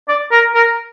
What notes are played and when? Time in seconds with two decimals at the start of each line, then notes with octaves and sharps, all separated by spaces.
0.08 D5
0.32 A#4
0.55 A#4